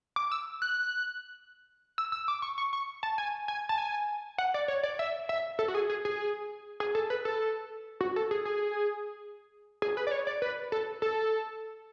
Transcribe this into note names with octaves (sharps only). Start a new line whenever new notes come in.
D6
E6
F#6
E6
E6
D6
C#6
C#6
C#6
A5
G#5
G#5
A5
G#5
F#5
D5
C#5
D5
E5
E5
A4
F#4
G#4
G#4
G#4
G#4
A4
B4
A4
F#4
A4
G#4
G#4
G#4
B4
D5
C#5
D5
B4
A4
A4